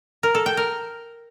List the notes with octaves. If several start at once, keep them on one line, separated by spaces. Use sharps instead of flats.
A#4
A4
G5
A#4